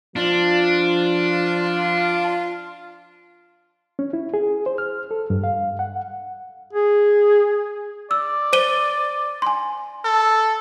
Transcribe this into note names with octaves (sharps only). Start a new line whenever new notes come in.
F3 D4 F4
C#4
E4
G#4
C5
F6
A4
G2
F5
F#5
G#4
D5 E6
C5 D#7 G7
G#5 C6
A4